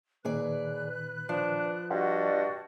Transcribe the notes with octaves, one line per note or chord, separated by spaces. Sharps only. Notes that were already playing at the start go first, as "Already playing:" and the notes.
D#2 A#2 D#3 G#4 B4 D5 F#6
F3 D4
G2 F#4 D5 D#5 F#5 A5 C6